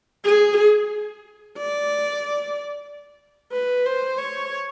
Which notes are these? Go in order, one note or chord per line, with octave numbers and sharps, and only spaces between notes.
G#4
D5
B4
C5
C#5